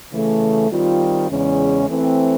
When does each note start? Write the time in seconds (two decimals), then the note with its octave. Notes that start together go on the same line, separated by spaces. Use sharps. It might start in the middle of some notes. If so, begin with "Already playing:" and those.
0.10 C#3 E3 A3
0.70 D#3 G3 C4 F4
1.29 E2 C#3 E3 G#3 C#4
1.87 E3 A3 C4